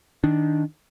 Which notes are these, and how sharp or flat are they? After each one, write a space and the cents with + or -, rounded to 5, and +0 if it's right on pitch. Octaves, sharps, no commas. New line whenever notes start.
D#3 +10 D4 +0